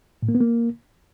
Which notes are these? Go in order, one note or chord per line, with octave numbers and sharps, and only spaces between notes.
A2
A#3
B3
A#3